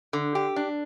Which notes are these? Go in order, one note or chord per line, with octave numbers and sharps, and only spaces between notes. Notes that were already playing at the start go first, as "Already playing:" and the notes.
D3
G4
D4